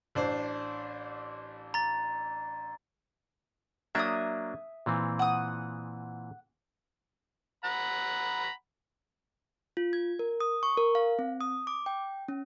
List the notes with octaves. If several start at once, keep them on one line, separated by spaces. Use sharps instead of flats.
A1 D4 C5
A#5 A6
F#3 A#3 D4 E5 D#6
A#2 E3 C4
F#5 D#6
F#5 A#5 B5
F4
G#6
A#4
D#6
C#6
A#4
F5
C4
D#6
D6
G5
C#4